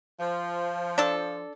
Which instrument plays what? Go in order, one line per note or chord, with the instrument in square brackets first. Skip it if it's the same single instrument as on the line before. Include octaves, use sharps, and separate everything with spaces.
[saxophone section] F3
[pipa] D4 A4